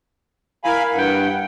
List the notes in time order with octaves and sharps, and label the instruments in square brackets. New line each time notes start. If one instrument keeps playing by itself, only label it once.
[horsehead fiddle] E4 A#4 [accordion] F5 G#5 B5
[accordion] G2 [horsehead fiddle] F#5 G5